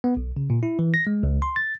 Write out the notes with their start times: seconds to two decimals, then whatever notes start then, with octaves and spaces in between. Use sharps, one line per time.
0.04 B3
0.17 B1
0.37 C#3
0.50 A#2
0.63 E4
0.79 E3
0.94 A#6
1.07 G#3
1.23 C#2
1.42 C6
1.56 A6